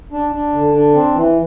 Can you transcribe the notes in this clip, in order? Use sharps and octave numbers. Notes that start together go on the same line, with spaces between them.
D4
D4
D3
D4
C4
E3